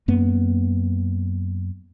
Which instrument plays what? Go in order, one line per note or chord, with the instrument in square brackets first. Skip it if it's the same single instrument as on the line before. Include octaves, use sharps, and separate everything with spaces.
[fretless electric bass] F#2 A#3 B3